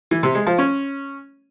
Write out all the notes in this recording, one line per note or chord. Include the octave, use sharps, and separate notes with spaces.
E3
C3
G#3
F3
C#4